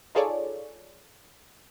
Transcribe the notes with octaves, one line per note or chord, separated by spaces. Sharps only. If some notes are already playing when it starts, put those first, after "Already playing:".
D#4 F4 G#4 A4 C#5 D5